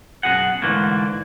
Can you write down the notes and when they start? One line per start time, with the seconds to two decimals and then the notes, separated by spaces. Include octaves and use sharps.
0.23 F#2 B2 F3 F#4 G#4 F#5
0.62 G#2 D3 E3 A3 A#3